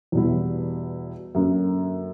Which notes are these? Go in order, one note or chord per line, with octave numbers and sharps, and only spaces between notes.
E2 B2 G3 B3 E4
F#2 D3 F#3 A#3